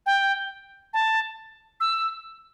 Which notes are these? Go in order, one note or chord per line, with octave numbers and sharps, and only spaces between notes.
G5
A5
E6